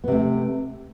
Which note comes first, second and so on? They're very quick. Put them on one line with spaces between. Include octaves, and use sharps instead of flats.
B3 C3 A3